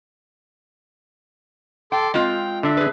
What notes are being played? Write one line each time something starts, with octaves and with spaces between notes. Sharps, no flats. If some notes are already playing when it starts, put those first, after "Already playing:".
A4 G5 C6 D6
G#3 C4 F4 G5
D3 D4 E5
G#4 B4